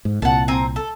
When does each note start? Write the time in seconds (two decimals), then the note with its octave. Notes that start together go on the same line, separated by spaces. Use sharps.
0.05 G#2
0.22 C2 A#2 F#5 A5
0.48 C4 G#5 A#5
0.76 A4